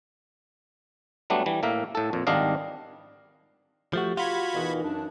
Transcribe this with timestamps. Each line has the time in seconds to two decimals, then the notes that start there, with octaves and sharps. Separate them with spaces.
1.30 F#3 G3 A3 B3 D4
1.46 E3 G3
1.63 A2 A#3 A#4 E5
1.95 A2 A4
2.13 F2 A#2
2.27 G#1 D#3 G3 D4 D#5 F5
3.93 F3 A3 F#4 G4
4.17 F4 F#4 B5 G#6
4.54 E2 B2 E3 D#4 A#4
4.83 F#2 D4